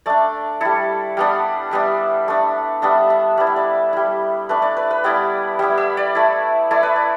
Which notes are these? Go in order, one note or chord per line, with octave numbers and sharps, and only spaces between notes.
A3 D4 D5
G3 E4 A4
G3 B3 D4
G3 B3 D4 E5
A3 D4
G3 B3 D4 E5
E5
G3 B3 E4 D5
E5
D5
G3 E4
A3 D4 B4
D5
B4
B4
G3 B3 E4 D5
G3 B3 E4 E5
E5
D5
A3 E4
A3 E4 D5
B4
D5